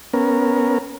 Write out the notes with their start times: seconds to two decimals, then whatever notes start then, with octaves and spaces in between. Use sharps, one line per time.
0.14 B3 C#4 A#4